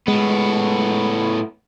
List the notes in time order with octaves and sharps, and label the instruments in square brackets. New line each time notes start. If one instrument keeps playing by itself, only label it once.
[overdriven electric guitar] A2 B3 [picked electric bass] G#3